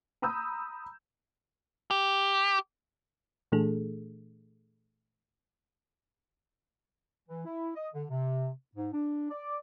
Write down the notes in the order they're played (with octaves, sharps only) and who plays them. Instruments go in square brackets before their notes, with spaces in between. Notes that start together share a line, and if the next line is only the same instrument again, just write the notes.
[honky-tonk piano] A#5 B5 D#6 E6 G6
[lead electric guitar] G4
[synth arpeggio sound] A#2 E3 A3 D4 G#4 A4
[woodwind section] E3
E4
D#5
D3
C3
G#2
D4
D5